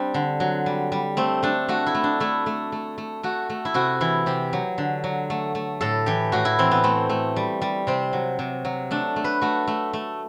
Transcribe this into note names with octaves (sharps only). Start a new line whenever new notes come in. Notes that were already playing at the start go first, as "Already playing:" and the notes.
Already playing: G3 C4 D4
D3
F#3
G3
G3
A3 C4
A3 D4
A3 F#4
E4
A3
D4
A3 E4
A3
A3
A3
A3 F#4
A3
E4
C3 F#4
E3 E4
C3 G4
F#3
D3
F#3
A3
A3
A2 A4
E3 G4
A2 F#4
E4
E3 C4
B3
A3 C4
A3
G3
G3
C3 C4
F#3
C3
F#3
A3 D4
A3
B4
A3 F#4
A3
A3